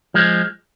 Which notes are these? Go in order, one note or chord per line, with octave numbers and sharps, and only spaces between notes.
F3 G#3